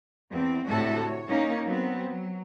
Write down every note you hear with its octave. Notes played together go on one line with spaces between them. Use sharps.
E2 C4
D2 A2 C3 F#4 A4 E5
C#5
A#3 C#4 D#4
F#3 B3 C4
F#3